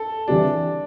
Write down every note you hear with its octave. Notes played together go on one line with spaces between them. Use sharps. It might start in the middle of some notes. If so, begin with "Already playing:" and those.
Already playing: A4
E3 G3 C4 D4 G4